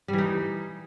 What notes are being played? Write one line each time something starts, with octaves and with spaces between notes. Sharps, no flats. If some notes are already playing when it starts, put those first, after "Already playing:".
E3 G3 D#4